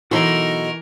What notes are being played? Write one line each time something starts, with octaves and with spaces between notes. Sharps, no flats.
B1 E3 D#4 F#4 A4 A#4 C6